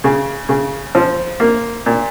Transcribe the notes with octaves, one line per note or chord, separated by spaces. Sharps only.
C#3
C#3
F3
A#3
A#2